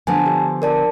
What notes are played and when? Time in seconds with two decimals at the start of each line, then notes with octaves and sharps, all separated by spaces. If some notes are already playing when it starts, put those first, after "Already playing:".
0.07 D3 F3 B3 G#5 A5
0.26 D4 G4
0.62 A#4 D5 A5